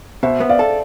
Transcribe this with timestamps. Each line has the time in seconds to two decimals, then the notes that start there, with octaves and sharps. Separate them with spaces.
0.23 B2 C5 E5
0.40 B3
0.49 D5 F5
0.59 A4